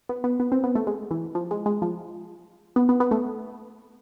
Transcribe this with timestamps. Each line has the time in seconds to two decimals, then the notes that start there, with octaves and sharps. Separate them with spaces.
0.09 B3
0.24 B3
0.40 B3
0.52 C4
0.64 B3
0.75 A3
0.87 G#3
1.11 E3
1.35 F3
1.51 G#3
1.66 G#3
1.82 F3
2.76 B3
2.89 B3
3.00 B3
3.11 A3